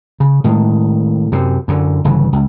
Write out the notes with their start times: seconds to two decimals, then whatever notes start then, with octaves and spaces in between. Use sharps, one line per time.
0.20 C#3
0.44 A2 D#3 G#3
1.32 F#2 C3
1.68 F#2 D3
2.05 G1 C#3 E3
2.33 C#2